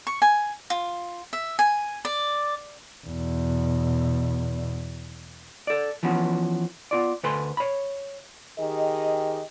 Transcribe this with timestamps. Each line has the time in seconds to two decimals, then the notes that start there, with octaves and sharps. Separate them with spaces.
0.07 C#6
0.22 G#5
0.70 F4
1.33 E5
1.59 G#5
2.05 D5
3.07 E2 B2
5.67 A4 D5
6.03 E3 F3 B3 C#4 F#4
6.91 B3 F4 D5
7.23 D2 A4 B4 G#5 C6
7.57 C#5 B5
8.59 D#3 G4 G#4 D#5